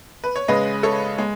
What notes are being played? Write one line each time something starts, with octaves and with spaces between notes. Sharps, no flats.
B4
C#5
C#3 G#3 B4 D#5
A4 C#5
G#3